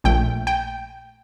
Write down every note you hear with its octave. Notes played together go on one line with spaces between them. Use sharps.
A#1 A#2 A3 G5
G5